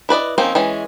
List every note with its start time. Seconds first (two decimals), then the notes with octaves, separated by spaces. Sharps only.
0.09 E4 B4 D5 D#5
0.38 F3 A#3 C4 C#4 D#4
0.55 E3 G#3 C#4